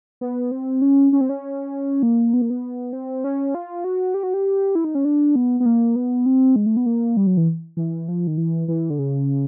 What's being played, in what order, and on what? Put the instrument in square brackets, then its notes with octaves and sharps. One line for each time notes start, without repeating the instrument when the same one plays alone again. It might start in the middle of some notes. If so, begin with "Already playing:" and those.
[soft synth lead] B3
C4
C#4
C#4
C4
C#4
A#3
B3
A#3
B3
C4
C#4
F4
F#4
G4
F#4
G4
E4
D#4
C#4
D4
B3
B3
A#3
B3
C4
G#3
A3
B3
A#3
G3
F#3
E3
E3
F3
D#3
E3
E3
D3
C#3